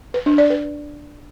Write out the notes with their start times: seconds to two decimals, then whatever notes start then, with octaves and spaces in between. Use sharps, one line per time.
0.14 B4
0.26 D4
0.38 D5
0.50 B4